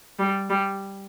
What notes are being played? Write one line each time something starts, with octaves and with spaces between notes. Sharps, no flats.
G3
G3